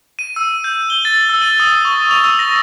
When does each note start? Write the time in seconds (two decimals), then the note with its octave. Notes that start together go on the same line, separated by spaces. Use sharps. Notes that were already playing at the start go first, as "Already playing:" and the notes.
0.19 D#7
0.36 E6
0.64 G6
0.90 G7
1.05 A6
1.29 E6
1.42 D#7
1.60 D#6
1.85 C#6
2.11 F7
2.24 E6
2.39 A#6